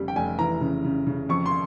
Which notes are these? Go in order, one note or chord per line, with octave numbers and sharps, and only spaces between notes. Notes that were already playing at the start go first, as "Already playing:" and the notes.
Already playing: F1 C#3 G3
G5
F1 G#5
E3 A#5
C#3
C#3
C#3
F2 C#6
C6